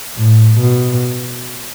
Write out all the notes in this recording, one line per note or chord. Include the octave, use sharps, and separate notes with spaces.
A2
B2